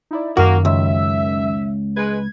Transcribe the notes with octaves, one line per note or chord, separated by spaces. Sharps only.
D#4 E4 D5
F#2 D#3 A#3 F#4
C#2 E5
G#3 B4 G#6